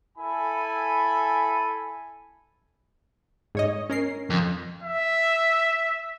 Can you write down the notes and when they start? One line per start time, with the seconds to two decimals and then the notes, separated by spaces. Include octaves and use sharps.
0.17 E4 A4 G#5 B5
3.55 G#2 C#5 D#5
3.89 C#4 A#4 C7
4.30 F2
4.83 E5